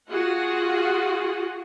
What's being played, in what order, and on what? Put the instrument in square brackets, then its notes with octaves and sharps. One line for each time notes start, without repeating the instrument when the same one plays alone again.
[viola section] F4 F#4 G#4 F#5